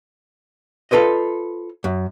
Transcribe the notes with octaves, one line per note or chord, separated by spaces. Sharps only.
F4 A4 B4 C5 D#5
F#2